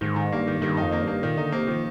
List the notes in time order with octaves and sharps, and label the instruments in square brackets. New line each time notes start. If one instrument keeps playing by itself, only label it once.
[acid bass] G#2 [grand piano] D#3
[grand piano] D#3
[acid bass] G2 [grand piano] A#3
[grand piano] D#3
[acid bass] G2 [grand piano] D#3
[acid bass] F2 [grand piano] D#4
[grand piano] A#3
[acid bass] G2
[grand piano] A#3
[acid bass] A#2 [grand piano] D#3
[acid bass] D3 [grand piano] D#4
[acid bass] C3 [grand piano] A#3
[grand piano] D#3 [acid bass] F3